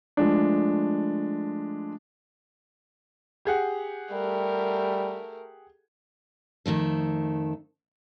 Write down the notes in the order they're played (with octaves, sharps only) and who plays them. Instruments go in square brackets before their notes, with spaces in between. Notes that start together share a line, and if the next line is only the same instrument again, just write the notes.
[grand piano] F3 G#3 A3 D4
G4 G#4 F#5
[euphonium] G3 [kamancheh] A3 A#4
[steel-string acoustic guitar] F2 D#3 A3 A4